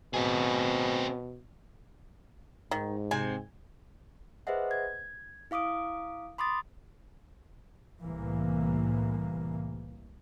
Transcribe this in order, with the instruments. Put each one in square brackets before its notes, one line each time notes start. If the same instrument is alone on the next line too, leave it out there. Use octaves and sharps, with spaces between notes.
[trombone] B2 [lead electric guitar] C4 G#4
[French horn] G#2 [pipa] D#3
[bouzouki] C3 C4 [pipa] G#5
[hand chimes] G#4 B4 C5 D#5 E5 F#5
G#6
E4 F5 D6 D#6 D7
B5 C6 D6 D#6 A6
[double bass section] C2 A2 E3 A#3